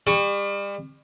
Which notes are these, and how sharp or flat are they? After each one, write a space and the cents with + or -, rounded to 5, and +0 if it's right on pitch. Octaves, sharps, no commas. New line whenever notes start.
G3 +35 C#6 +10